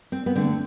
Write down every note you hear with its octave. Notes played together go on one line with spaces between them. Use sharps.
C4
B3
D3 A3 C4